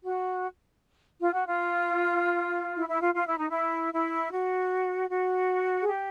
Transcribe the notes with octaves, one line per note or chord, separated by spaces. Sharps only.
F#4
F4
F#4
F4
E4
E4
F4
F4
E4
D#4
E4
E4
F#4
F#4
G#4
G4